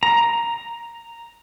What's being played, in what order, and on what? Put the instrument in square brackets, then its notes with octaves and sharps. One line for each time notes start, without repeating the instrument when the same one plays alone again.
[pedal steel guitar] A#5